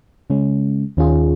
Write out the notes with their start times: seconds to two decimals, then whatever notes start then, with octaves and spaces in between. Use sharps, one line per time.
0.30 C#3 G#3 C#4
0.97 D#2 D#3 C#4 F4 G#4